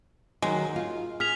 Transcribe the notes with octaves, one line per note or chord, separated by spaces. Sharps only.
D#3 F#3 G#3
F4
G#4 F6 B6 F7